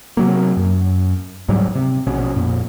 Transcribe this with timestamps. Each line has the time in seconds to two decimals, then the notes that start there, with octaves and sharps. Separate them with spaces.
0.17 C3 F#3 A#3
0.57 F#2
1.48 D2 G#2 F#3 G3
1.75 C3
2.07 A#1 B2 C#4
2.36 F2 A#2